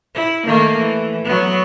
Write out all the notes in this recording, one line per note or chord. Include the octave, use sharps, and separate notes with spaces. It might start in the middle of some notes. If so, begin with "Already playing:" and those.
E4
D#3 A3 A#3
E3
F#3 B3